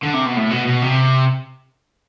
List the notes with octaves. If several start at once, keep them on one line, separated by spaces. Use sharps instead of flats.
D3
C3
B2
A2
B2
B2
C3